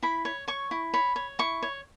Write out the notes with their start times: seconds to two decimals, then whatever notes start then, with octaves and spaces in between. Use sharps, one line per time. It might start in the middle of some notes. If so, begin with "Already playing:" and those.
0.03 E4 B5
0.25 C#5
0.48 C#5 C#6
0.71 E4
0.94 C#5 B5
1.16 C#5
1.39 E4 C#6
1.62 C#5